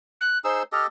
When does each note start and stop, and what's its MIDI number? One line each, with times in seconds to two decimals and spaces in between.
0.20 0.38 90
0.44 0.63 63
0.44 0.63 68
0.44 0.63 72
0.44 0.63 88
0.72 0.87 67
0.72 0.87 69
0.72 0.87 75
0.72 0.83 89